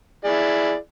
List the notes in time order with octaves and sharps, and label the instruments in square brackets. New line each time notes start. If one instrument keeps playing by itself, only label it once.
[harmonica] E4 G#4 D5